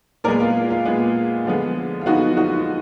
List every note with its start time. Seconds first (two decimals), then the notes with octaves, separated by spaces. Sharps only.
0.24 A#2 A#4 D5
0.27 G#3 B3
0.40 F4
0.70 F4
0.85 A#2 G#3 B3
1.45 D3 F3 G#3 B3
2.01 F4
2.06 D3 F3 G#3 B3 D#4 F#4
2.37 D#4 F#4